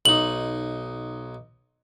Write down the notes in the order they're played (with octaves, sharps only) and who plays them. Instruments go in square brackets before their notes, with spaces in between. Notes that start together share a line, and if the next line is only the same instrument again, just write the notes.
[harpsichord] B1 D#4 [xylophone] F#7